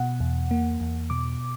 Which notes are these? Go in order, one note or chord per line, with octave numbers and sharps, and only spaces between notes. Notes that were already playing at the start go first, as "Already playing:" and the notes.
Already playing: B2 F#5
E2
A#3
E2
B2 D6